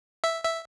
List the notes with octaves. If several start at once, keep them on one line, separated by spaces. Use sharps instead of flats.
E5
E5